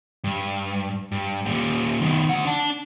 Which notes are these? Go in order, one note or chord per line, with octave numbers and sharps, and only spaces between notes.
G2
G2
A#2 G3
D#3 B3
D2 F#5
D4 A5